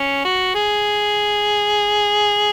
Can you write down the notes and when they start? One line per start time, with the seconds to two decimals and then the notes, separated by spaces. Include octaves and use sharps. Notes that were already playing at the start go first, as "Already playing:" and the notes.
Already playing: C#4
0.25 F#4
0.55 G#4